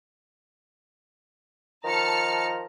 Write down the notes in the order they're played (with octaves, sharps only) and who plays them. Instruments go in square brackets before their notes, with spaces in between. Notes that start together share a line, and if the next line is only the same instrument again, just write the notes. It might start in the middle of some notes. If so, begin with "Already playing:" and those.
[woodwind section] D#3 F3 A#5 [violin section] A5 F6 C#7